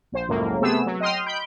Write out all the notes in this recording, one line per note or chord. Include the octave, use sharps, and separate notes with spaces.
A#1 C5
C#2 F#2 A2 A#3
C3 A3 B3 G#4 E6
F#3
D#5 G5 C6 D#6 F6
B5 G6 D7